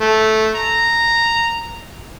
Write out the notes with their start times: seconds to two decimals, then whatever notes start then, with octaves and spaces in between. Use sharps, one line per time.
0.01 A3
0.55 A#5